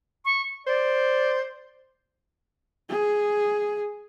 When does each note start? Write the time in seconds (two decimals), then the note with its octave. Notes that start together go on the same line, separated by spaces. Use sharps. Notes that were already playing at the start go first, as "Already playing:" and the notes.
0.25 C#6
0.67 C5 D5
2.89 G#4